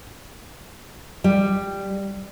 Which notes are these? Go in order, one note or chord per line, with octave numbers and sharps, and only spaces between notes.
G3